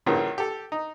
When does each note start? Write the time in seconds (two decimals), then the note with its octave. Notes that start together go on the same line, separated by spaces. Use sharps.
0.06 A#1 G2 A#2 C#3 E3
0.38 G4 A4
0.72 D#4